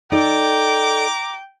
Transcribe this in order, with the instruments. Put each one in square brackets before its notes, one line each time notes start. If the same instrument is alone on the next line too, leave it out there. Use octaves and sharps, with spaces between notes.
[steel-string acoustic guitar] D#4 A4 D5 [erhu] G5 [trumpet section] A#5 D6